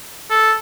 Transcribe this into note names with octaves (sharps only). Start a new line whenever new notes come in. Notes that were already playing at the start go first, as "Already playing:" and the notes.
A4